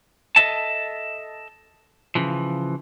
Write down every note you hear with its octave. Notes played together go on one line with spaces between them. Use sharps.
A4 A#4 D#5 E5 A5
C#3 E3 F3